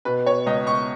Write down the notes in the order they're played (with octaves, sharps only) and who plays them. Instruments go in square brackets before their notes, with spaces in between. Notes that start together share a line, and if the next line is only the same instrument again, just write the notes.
[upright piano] B2 B4
C#5
C#2 D#5
C#6